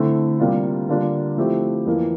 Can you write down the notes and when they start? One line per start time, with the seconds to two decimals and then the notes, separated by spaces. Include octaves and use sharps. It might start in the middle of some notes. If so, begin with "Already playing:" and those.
Already playing: D3 A3 C4 E4
0.39 C3 G3 A#3 D4 F4
0.89 D3 G3 A#3 D4 F4
1.37 F3 A3 C4 E4 G4
1.86 F2 E3 A#3